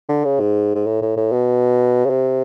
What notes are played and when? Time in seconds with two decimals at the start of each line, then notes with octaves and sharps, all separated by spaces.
0.09 D3
0.24 C#3
0.40 G#2
0.75 G#2
0.87 A2
1.02 A2
1.17 A2
1.32 B2
2.05 C#3
2.10 C3